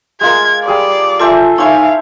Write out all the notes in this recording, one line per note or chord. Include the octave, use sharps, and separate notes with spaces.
G#3 F4 A#4 G#6
G3 G#4 D5
F4 A4 C5 E5 G#5
D#4 E4 C5 C#5 F5 G#5